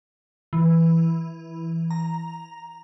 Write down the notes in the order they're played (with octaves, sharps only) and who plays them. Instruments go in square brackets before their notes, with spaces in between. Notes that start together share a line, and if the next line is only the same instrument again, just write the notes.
[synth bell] E3
A#5